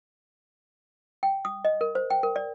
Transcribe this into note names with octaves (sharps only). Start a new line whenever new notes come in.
G5
D#6
D#5
A#4
C5
G5
A#4
D5